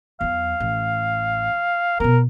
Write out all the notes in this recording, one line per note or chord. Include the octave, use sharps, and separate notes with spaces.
E2 F#3 F5
A1
B2 B3 A#4